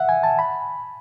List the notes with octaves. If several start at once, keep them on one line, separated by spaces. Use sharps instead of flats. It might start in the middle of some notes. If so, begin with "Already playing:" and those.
Already playing: E5 F#5
G#5
A5
B5